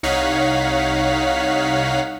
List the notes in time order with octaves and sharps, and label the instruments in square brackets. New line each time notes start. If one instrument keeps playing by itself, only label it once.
[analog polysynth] C2 D#4 C#5 F5 F#5 B6